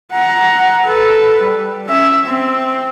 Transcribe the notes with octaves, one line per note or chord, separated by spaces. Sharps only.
F#5 A#5
A4 B4
G3
C#4 E5
C4